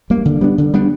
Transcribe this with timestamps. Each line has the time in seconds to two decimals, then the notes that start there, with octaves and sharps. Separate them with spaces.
0.10 G3 A#3
0.25 D3
0.41 G3 B3 D4
0.58 D3
0.74 G3 B3 D4